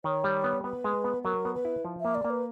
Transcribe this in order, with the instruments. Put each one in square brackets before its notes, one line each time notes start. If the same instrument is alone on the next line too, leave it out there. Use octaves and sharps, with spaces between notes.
[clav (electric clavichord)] D#3 [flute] C#5
[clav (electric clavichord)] G3
B3
[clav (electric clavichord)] B3 [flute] B4
[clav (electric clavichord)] G#3
B3
[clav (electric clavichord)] F#3 [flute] A#4
[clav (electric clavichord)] B3
[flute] B4
[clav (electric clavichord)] E4
F3
[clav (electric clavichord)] A#3 [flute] E5
[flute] D5
[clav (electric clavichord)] A#3
[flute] B4